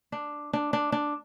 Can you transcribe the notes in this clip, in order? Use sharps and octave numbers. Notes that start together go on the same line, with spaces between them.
D4
D4
D4
D4